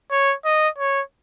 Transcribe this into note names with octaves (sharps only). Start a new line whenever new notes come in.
C#5
D#5
C#5